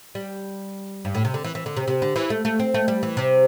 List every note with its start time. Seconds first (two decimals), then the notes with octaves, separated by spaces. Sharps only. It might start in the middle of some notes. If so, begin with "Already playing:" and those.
0.15 G3
1.05 G2
1.15 A2
1.25 C3
1.34 D3
1.44 E3
1.55 E3
1.66 D3
1.77 C3
1.88 C3
2.02 D3
2.16 E3
2.30 A3
2.45 A3
2.59 C4
2.74 A3
2.88 G3
3.03 E3
3.17 C3